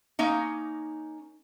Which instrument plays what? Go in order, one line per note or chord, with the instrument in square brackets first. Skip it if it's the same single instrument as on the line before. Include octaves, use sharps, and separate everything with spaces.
[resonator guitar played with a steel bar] A#3 C#4 D#4